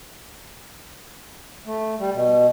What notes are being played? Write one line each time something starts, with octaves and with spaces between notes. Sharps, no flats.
A3
G3
B2